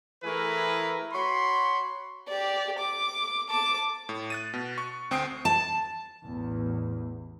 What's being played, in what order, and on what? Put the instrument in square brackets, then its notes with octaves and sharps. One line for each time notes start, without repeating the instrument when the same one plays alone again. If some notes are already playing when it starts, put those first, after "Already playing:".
[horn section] E3 A3 E4 G#4 A#4 B4
F#4 C#5 B5 C6
[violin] G4 D5
D6
A5 D6
[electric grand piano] A2
F#6 A6 D#7
B2
C#6
D2 C4 G5 D#6 C7 D7
[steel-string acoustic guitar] A5
[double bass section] A1 E2